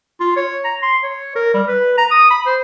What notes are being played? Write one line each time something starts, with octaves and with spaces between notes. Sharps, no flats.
F4
C#5
A#5
C6
C#5
A#4
G3
B4
A#5
D#6
B5
C5